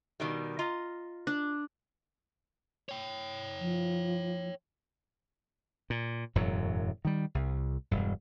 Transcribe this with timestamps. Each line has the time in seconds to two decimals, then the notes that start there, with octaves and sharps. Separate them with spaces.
0.20 B2 D#3 G3
0.59 F4 D#5 A#5
1.27 D4
2.89 C#5 G5
3.60 F3
5.90 A#2
6.35 E1 F#2 A2 F#3
7.05 D#3 G3
7.35 C2
7.91 E1 G2